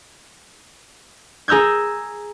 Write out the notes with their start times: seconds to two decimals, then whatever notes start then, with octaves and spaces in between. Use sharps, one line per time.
1.48 G#4 A#5 E6 G6 G#6